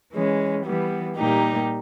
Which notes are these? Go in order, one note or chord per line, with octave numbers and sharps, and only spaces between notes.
E3 G#3 C#4
E3 G3 B3
A#2 G3 A#3 D#4 G4